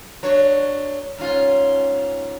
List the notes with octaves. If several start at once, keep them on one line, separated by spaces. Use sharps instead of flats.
F#3 D4 C#5
G#2 C#4 F4